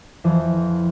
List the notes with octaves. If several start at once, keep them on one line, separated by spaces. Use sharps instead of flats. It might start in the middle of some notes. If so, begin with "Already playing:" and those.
F2 E3 F3 C5